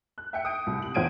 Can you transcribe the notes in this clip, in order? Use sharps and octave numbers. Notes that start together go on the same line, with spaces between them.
F#6
E5 G5 C#7
D#6 G6 D7
C2
F#7
E2 F4 C5 G#6 D7 D#7